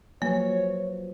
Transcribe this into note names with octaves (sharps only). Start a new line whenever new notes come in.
F3 F#3 A#3 B4 C#5